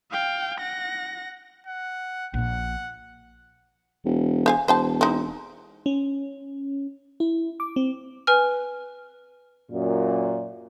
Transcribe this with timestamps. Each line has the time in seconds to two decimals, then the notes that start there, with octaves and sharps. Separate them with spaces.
0.11 F5 G5
0.59 F#5 A#6
1.67 F#5
2.34 A#1 A#2 F#5
4.05 E1
4.46 C5 F5 G#5
4.68 E1 C5 G5 A5
5.01 C4 D#4
5.86 C#4
7.20 E4
7.60 D6
7.76 C4
8.27 B4 G#5 F6
9.71 F#2 A#2